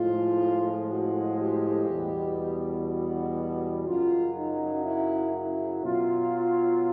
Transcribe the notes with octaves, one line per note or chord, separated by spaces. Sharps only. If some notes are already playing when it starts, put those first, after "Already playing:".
Already playing: A2 F3 G#3 F4
F#4
G4
E2 B2 G3
F#4
F#2 C#3 F#3 F4
D#4
E4
E4
B2 F#3 F4